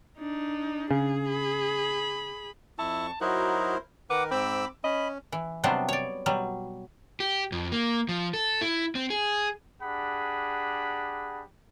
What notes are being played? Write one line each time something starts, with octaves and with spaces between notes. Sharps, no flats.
D4 D#4
C#3 G#4
B5
F2 E4 A5 C#6
F#3 D#4 E4 F#4 A#4 C5
D#3 A#4 B4 F#5 D6
G#2 C4 B5 D6 E6
C#4 D#5 B5
E3
C3 F#3 G3 B3 D4 C5
C#5 D5
B2 F#3 G3
G4
F2
A#3
F3
A4
E4
C4
G#4
D4 G4 G#4 F#5 B5